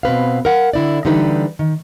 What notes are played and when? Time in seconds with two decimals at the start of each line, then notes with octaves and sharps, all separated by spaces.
0.03 B2 C4 B4 F5
0.45 A#4 F5 F#5
0.73 D3 E4 D5
1.05 D3 E3 G3 D#4 B4
1.59 D#3